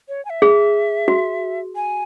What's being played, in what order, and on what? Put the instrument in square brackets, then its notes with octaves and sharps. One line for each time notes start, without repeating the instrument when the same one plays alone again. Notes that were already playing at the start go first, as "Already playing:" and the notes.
[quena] C#5
G#5
E5
[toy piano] G#4
F#4
[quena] G#5